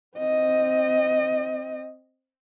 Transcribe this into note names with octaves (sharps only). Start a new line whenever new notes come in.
C4 D#5